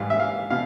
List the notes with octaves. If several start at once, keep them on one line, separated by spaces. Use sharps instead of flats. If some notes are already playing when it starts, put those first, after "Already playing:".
Already playing: G#2 E3 G3 F5
E5
F5
B2 F5